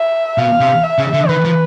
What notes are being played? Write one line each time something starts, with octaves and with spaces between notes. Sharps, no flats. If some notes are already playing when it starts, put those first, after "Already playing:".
Already playing: E5
B2 F5
C3
E5
C#3
D3
D#3 B4
F3